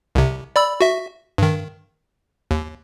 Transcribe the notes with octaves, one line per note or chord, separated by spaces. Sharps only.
C2 C3
D5 B5 E6
F#4 E5
G2 D#3
D#2